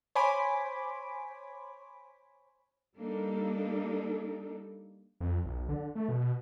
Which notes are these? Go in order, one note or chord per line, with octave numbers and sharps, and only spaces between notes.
C5 C#5 G#5 B5 D6
G3 A#3 D4 D#4 A4
F2
B1
D3
A3
B2